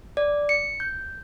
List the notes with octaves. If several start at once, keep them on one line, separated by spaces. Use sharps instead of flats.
D5
C#7
G6